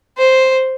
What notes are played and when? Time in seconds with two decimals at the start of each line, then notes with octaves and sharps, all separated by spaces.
0.17 C5